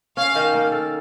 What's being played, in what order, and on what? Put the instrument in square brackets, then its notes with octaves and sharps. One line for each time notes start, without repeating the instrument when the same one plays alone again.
[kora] C#4 [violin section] F5
[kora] D#3
A#3
A4